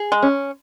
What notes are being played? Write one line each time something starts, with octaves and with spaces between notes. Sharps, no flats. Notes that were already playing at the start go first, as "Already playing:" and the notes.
Already playing: G#4
G#3
C#4